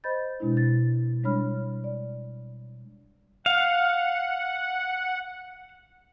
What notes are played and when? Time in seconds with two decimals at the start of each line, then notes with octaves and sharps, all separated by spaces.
0.04 C5 D#5 B5 G6 A6
0.40 B2 G#3 D4 E4
0.57 A6
1.23 G3 G#3 D4 C#5 B5 F6
1.84 D5
3.46 F5 F#5